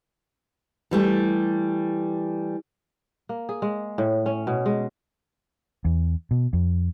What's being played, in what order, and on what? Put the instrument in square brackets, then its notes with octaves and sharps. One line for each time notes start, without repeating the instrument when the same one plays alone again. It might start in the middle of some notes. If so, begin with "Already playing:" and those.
[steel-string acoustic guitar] E3 G3 A3
[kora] A#3
G#4
G#3
A2
C#4
B2
G#3
[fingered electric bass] E2
B2
F2